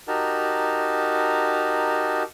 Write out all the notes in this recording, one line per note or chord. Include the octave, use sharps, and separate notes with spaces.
D#4 F#4 G4 A#4 A5